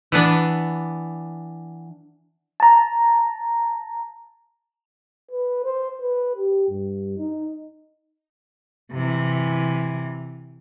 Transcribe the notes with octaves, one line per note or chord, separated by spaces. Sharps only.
E3 B3 D4
A5 A#5
B4
C5
B4
G4
G2
D#4
C3 E3